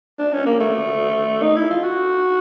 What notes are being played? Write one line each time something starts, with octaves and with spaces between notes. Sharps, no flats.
D4
C#4
A#3
A3
D#4
E4
F4
F#4